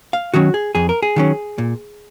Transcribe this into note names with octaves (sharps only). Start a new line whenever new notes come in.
F5
D#3 F#3 C#4 F#4
G#4
F2 G#4
A#4
G#4
D#3 F#3 C#4
A#2